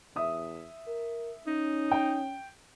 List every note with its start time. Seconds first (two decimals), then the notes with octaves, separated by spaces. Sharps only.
0.16 E2 E5 D#6
0.87 A#4
1.47 C#4 D#4
1.92 G5